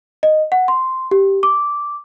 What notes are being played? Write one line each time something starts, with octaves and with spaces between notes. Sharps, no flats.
D#5
F#5
C6
G4
D6